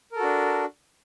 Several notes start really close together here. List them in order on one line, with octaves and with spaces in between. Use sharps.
A#4 A4 F#4 D4